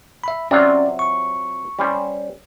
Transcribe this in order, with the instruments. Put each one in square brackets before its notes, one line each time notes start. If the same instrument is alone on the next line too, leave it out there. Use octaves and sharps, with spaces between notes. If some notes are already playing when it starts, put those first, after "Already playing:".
[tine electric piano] E5 B5
[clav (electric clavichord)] C3 F#3 F4 [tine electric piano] C#4 D5
[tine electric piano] C#6
[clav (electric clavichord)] G3 C#4 C5